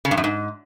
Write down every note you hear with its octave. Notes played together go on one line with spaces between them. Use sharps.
C#3
G2
F#2
G#2